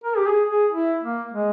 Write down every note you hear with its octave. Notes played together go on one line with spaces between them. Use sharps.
A#4
G4
G#4
G#4
E4
A#3
G#3